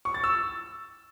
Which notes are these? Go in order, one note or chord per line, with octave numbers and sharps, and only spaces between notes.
C#6
A6
E6